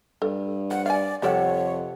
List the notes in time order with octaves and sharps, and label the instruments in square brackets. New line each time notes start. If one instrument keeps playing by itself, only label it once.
[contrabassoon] G2 [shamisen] A4
[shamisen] F3 [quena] F#5
[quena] D5 [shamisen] F5 G#5
[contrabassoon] F2 [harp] C3 A4 F#5 [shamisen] G3 G4 D5 [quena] C#5